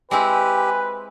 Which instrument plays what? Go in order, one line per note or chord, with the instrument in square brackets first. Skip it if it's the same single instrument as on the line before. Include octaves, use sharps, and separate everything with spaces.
[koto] G#3 C4 E4 [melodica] G4 [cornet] B4 [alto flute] G#5